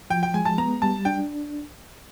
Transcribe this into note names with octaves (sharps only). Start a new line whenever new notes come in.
F3 G5
G5
G#3 G#5
A5
B3 A#5
G3 A5
D4 G5